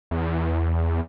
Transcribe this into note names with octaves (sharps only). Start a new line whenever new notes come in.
E2